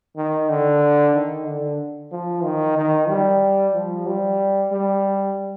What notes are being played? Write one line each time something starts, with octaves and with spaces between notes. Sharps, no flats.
D#3
D3
D#3
D3
F3
D#3
D#3
G3
F3
G3
G3